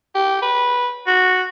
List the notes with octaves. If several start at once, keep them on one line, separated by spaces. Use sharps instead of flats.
G4
B4
F#4